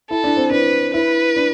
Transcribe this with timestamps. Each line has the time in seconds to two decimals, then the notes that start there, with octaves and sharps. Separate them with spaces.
0.10 E4 A4
0.24 D4
0.37 C4
0.50 D4 B4
0.94 E4 B4
1.36 D4